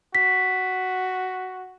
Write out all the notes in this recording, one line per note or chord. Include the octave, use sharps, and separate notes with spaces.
F#4 B6